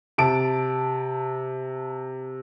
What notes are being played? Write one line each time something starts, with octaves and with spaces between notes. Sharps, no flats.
C3 A5 D7